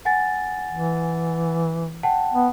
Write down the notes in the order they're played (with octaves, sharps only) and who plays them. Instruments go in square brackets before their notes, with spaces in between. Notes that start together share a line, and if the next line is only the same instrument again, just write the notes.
[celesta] F#5 G#5 A6
[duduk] E3
[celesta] F#5 G5 A5
[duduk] B3